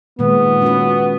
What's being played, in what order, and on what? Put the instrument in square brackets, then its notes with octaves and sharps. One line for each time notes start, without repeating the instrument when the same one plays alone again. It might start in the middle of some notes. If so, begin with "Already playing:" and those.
[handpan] A#2 D#3 G#3 [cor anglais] B3
[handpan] C#4 F#4 B4